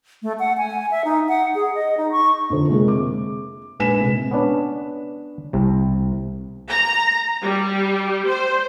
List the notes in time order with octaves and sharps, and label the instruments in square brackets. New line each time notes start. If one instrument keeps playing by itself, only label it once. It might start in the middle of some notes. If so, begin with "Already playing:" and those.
[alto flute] A3
F#5
G#5
E5
D#4
F#5
G#4
D#5
D#4
C#6
[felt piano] F2 D3 C5
C3 G#3 A#3 G#4
D6
A#1 G#3 B4 G#5 B6 E7
C3 G#3
[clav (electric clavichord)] B3 C#4 D4 B4
C2 C3
[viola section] A#5
G3
C5